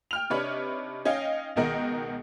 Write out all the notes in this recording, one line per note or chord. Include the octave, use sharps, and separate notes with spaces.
G5 F6 F7
C3 D4 D#4 B4 C#5 B5
C#4 D#4 D#5 F5 G5
C#2 B2 D#3 A#4 D#5 F#5